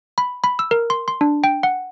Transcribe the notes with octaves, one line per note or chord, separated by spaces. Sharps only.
B5
B5
E6
A#4
C6
C6
D4
G5
F#5